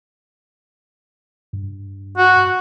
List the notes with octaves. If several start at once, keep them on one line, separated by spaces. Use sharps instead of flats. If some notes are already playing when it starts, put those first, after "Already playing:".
G2
F#4